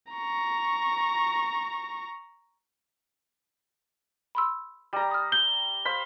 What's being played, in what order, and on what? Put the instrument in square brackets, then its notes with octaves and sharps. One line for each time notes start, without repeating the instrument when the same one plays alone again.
[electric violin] A#5 C#6
[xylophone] B5 C6 E6
[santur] G3 A#5
[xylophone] D#6 F6
[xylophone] G6 [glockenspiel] G7
[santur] C5 F5 B5